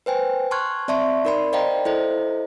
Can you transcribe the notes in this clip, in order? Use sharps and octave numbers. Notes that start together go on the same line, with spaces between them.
B4 C5 G5 G#5
A5 C6 C#6 F6 F#6 G#6
C4 D5 E5 A5 C6 C#6
D#4 A#4 D5 B5 C6
C5 D5 D#5 F5 G5 A#5
E4 A4 C5 D#5